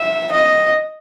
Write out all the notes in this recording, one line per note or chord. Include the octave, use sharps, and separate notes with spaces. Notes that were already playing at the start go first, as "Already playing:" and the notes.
Already playing: E5
D#5